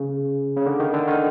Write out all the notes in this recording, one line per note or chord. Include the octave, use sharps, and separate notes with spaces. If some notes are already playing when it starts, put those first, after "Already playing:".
Already playing: C#3
C#3
D3
D#3
D3
D#3